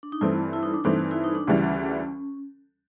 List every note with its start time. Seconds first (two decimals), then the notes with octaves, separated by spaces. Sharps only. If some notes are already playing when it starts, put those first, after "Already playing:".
0.03 D4
0.12 D#4
0.21 G2 E3 A3 C4 E4
0.53 E4
0.63 D#4
0.74 D4
0.84 G2 E3 A3 C4 D#4
1.11 E4
1.24 D#4
1.35 D4
1.47 D2 C#3 E3 G3 C#4